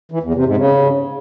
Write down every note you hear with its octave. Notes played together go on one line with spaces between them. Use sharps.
E3
E2
C3
G#2
C#3